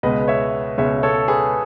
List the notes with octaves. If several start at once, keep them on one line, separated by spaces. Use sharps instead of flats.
C#2 B2 G#3 B4 D#5
C#5 E5
C#2 B2 G#3 C#4 C#5 E5
A4 C#5
G#4 B4